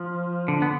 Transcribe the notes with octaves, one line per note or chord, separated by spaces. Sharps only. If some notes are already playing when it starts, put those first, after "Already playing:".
Already playing: F3
D3
B3